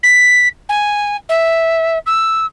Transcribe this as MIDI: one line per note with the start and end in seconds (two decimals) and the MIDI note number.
0.03 0.48 95
0.69 1.16 80
1.29 1.98 76
2.06 2.46 88